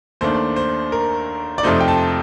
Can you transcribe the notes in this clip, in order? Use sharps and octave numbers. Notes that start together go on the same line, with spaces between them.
D#2 D#3 A3 D4 C5
C5
A#4
D5
F2 C3 F3 A3 D#4 C5
G5
A5